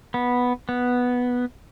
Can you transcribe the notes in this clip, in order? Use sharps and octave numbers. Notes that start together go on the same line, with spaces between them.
B3
B3